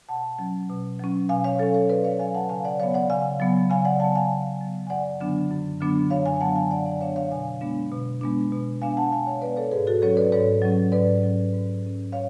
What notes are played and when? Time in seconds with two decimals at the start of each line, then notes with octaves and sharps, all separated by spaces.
0.09 B2 F#5 A5
0.39 F#3 C#4
0.69 B2
1.00 F#3 C#4
1.29 B2 F5 G#5
1.44 C#5 F5
1.59 F#3 C#4 A4 C#5
1.74 A4 C#5
1.89 B2 B4 D5
2.04 C#5 F5
2.19 F#3 C#4 F5 G#5
2.34 F#5 A5
2.49 C#3 F5 G#5
2.65 D5 F#5
2.80 F#3 B3 C#5 F5
2.94 D5 F#5
3.10 C#3 F5 G#5
3.40 F#3 B3
3.70 C#3 F5 G#5
3.85 D5 F#5
4.00 F#3 B3 F#5 A5
4.15 F5 G#5
4.30 C#3
4.61 F#3 B3
4.87 G#5
4.90 F#2 D5 F#5
5.21 D3 F#3 B3 D4
5.51 F#2
5.81 D3 F#3 B3 D4
6.11 F#2 C#5 F5
6.26 F5 G#5
6.41 D3 F#3 B3 D4 F#5 A5
6.56 F5 G#5
6.71 F#2 D5 F#5
6.86 D5 F#5
7.01 D3 F#3 B3 D4 C#5 F5
7.16 C#5 F5
7.31 B2 F5 G#5
7.61 G#3 B3 D4
7.92 B2
8.21 G#3 B3 D4
8.52 B2
8.82 G#3 B3 D4 F5 G#5
8.97 F#5 A5
9.12 B2 F5 G#5
9.27 C#5 F5
9.42 G#3 B3 D4 B4 D5
9.56 A4 C#5
9.71 G#2 G#4 B4
9.87 F#4 A4
10.02 F#3 C#4 A4 C#5
10.17 B4 D5
10.32 G#2 A4 C#5
10.62 F#3 C#4
10.92 G#2 B4 D5
11.22 F#3 C#4
11.53 G#2
11.83 F#3 C#4
12.12 C#5 F5